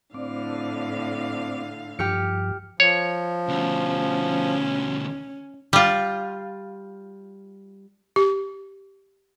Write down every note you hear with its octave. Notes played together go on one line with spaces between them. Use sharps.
A2 D3 C4 D5 F5
G2 F3 G4 F6 C#7
F3 C#5
D2 B2 C#4
G3 F4
G4